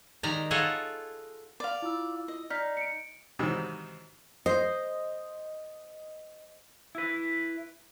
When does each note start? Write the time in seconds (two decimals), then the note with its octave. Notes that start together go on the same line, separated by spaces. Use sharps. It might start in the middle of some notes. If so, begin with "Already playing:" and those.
0.23 D#3 G#3 G4 D5 A#5
0.51 F4 G#4 A4 C#5 D#5 F#5
1.60 D5 F5
1.82 E4 F4 E6
2.28 D#5
2.50 D#4 D5 F6 B6
2.77 C#7 D7
3.39 G#2 C3 D#3 E3 F#3
4.46 C5 D#5
6.95 E4 B4